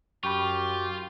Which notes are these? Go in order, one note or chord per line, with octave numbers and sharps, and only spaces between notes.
F#2 F4 G4 B5 C#6